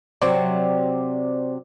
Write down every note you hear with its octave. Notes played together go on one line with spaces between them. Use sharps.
C3 F#3 C4 C5 D5